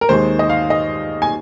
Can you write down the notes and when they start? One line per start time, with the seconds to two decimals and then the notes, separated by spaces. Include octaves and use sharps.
0.01 A#4
0.09 D#2 D#3 G#3 C5
0.39 D#5
0.50 F5
0.70 D#5
1.22 G#5